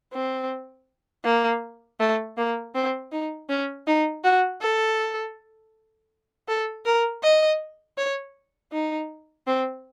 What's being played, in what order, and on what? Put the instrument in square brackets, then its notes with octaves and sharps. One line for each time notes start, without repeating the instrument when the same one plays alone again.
[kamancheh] C4
A#3
A3
A#3
C4
D#4
C#4
D#4
F#4
A4
A4
A#4
D#5
C#5
D#4
C4